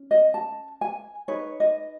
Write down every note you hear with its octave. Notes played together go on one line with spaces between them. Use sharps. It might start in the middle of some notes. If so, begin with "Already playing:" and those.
Already playing: C#4
D#5
A5
G#5
D#4 G#4 B4 C#5
D#5